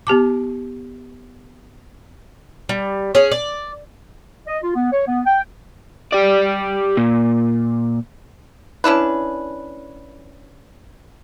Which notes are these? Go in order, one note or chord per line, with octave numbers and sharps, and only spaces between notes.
B3 G4 A5 D6
G3
C#4 G#4
D5
D#5
F4
B3
C#5
B3
G5
G4 D5
A#2
C#4 D4 E4 B4